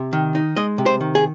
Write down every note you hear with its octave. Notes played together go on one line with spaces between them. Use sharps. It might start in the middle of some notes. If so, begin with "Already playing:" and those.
Already playing: C3
D#3
D#4
G#3 D#5
C3
C5
D#3
G#4